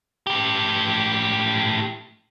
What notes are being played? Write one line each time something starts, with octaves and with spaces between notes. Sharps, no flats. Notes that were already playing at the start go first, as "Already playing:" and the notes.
A2 G4